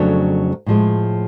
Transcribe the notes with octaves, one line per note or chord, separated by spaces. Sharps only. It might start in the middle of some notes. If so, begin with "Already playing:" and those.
Already playing: F2 C#3 F#3 A3 D4
A2 F3 G#3